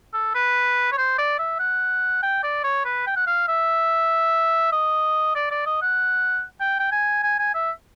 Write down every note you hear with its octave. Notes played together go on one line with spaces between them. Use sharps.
A4
B4
C#5
C5
D5
E5
F#5
G5
D5
C#5
B4
G5
F#5
F5
E5
D#5
D5
D5
D#5
F#5
G5
G5
G#5
G#5
G#5
E5